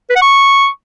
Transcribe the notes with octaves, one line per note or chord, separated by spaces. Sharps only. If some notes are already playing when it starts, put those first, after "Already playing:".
B4
F#5
C#6